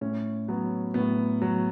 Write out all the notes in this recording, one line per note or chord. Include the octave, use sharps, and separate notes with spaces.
A2 C#4
F#3 B3
A2 B3
F#3